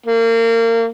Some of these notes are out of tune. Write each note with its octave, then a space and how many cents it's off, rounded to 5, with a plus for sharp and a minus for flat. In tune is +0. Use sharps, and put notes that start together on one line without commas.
A#3 -30